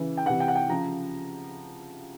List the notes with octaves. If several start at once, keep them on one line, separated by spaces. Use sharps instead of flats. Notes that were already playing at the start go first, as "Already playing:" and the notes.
Already playing: C#3 E3
G5
C3 E3 F#5
G5
F#5
G5
C#3 F3 A#5